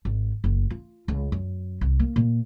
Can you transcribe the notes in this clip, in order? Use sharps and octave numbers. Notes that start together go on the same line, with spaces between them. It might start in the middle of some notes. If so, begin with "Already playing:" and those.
G#1
F#1
F4
C#2
F#2
C2
A#3
A#2